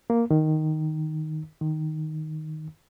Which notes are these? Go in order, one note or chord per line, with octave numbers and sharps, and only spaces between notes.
A#3
D#3
D#3